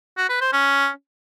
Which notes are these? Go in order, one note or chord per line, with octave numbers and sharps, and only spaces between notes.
F#4
B4
C5
C#4